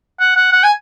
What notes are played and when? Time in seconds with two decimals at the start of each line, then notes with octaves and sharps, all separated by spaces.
0.20 F#5
0.36 F#5
0.52 F#5
0.63 G#5